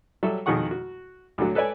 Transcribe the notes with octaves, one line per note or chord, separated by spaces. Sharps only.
F#3 G3 F#4 A4 E5
F2 B2 D#3 G#4 F#5 C#6
F#4
D2 D3 F#3
A4 B4 C#5 D5 G#5